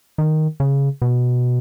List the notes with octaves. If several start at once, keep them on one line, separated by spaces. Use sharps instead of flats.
D#3
C#3
B2